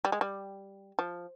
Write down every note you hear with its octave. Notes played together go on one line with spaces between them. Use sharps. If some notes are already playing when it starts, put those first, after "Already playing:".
G3
G#3
G3
F3